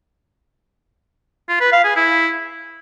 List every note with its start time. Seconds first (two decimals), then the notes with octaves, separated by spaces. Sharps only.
1.49 F4
1.61 B4
1.73 F5
1.84 G#4
1.96 E4